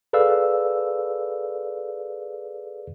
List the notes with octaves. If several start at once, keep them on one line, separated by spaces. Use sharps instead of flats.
G#4 A4 B4 D5 F5 E6